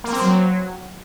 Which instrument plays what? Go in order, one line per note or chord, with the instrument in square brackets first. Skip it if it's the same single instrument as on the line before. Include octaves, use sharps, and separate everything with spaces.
[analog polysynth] A#3
C4
F#3